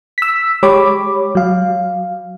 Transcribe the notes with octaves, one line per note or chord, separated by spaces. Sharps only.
E6 B6
G#3 G4 C#5 B5 D6
F#3 F5